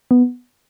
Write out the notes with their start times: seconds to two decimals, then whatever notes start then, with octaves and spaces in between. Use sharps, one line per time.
0.11 B3